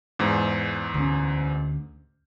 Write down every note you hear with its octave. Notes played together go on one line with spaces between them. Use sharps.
E2 G#2
D2 A3 C#4